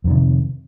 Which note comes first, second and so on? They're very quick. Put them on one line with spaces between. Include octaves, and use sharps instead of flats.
F2 D#3 C3